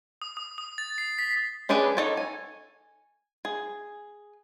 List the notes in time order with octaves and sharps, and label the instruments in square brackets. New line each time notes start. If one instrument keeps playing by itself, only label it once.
[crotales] D#6
D#6
D#6
A6
C7
B6
[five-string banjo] C#4 D4 G4 G#4 B4
D#4 A4 C#5
G#5
G#4